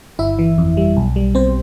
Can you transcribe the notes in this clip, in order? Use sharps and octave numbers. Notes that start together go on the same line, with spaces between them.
G1 E4 E5
E3
F2
G3
B1
G3
B2 C4 C5